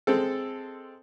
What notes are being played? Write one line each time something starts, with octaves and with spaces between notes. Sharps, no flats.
G#3 C4 A4